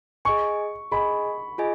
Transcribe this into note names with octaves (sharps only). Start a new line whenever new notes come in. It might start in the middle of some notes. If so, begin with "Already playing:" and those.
G#4 D#5 G#5 C#6
G#4 D#5 G#5 B5
F4 G#4 D#5 G#5